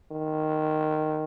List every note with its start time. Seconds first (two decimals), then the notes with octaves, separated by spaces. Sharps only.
0.12 D#3